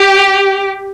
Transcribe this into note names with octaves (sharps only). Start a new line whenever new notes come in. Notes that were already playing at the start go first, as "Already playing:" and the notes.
Already playing: G4